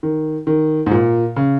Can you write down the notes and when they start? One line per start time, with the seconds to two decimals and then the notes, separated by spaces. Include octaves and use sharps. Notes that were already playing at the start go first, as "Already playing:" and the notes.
0.03 D#3
0.47 D#3
0.86 G#2
0.91 A#2
1.36 C#3